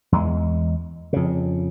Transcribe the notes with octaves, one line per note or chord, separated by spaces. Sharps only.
E2 G#3
F2 C#3